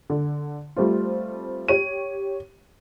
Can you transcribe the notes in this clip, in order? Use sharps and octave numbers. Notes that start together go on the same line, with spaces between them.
D3
G3 A3 C4 F4
G4 C#5 D#7